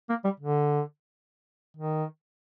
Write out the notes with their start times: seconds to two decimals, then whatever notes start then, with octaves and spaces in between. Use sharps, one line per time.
0.09 A#3
0.24 G3
0.40 D3
1.77 D#3